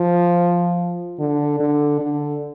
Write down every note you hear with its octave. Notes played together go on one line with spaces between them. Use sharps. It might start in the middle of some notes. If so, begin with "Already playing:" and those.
Already playing: F3
D3
D3
D3